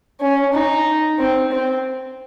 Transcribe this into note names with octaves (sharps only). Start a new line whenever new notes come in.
C#4
D#4
C4
C4